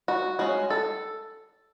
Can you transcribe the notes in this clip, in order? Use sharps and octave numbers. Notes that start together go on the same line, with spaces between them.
F#4
G#3 C#4 F#4
A4